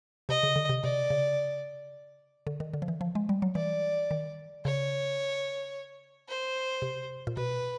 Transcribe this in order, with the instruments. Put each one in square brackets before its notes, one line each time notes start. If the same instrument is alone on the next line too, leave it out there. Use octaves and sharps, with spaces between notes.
[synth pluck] C3 [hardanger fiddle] D#5
[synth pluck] C#3
D3
C3
[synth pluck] C3 [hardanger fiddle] D5
[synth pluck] C#3
D3
D#3
D3
F3
E3
F3
G#3
G3
F#3
[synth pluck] E3 [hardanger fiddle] D5
[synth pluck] D#3
[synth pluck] C#3 [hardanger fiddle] C#5
[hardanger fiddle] C5
[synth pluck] C3
A#2
[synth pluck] B2 [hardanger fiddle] B4